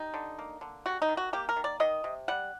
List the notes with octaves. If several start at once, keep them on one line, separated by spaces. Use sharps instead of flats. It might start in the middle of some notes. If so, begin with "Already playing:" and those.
Already playing: G3 D#4
D3
A#3
D3
G3 F#4
D#4
D#3
F#4
A#3 G4
A#4
D#3
D5
D#3 D#5
C3
G3 F#5